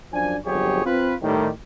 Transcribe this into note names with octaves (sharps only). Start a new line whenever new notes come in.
F#2 F3 D4 G#5
G1 F2 F#3 G4 G#4 C#5
C4 F4 B4
A2 D#3 G3